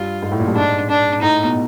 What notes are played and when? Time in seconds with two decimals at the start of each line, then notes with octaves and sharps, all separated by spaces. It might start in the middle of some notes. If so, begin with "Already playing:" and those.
Already playing: G2 F4
0.22 G#2
0.32 A2
0.40 A#2
0.48 G2
0.56 G#2 D4
0.89 D4
1.22 A2 D#4
1.44 B2